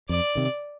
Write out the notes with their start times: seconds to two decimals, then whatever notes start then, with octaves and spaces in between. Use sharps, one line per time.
0.09 F2 D5
0.35 C3 D#3